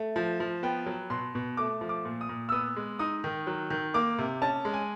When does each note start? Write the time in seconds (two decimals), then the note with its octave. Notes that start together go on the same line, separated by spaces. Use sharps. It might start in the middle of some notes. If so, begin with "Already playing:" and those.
Already playing: A3
0.16 F3
0.40 F3
0.63 B3 G5
0.86 F#3
1.10 B2 C6
1.35 B2
1.57 A3 D6
1.81 F3
1.89 D6
2.05 A#2
2.21 D#6
2.29 A#2
2.49 E6
2.52 B3 D#6
2.76 G#3
2.99 D#4 D#6
3.24 D#3
3.47 F#3
3.70 D#3
3.94 A#3 D6
4.18 C3
4.42 C#4 A5
4.65 G#3
4.74 G#5